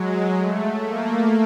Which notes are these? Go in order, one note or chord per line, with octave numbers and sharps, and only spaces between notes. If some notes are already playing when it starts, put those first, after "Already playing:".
Already playing: F#3 G#3
A3
A#3